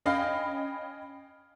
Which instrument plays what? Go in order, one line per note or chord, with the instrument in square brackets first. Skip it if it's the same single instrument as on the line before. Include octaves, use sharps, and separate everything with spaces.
[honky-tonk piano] C#4 D#5 F5 G5 B5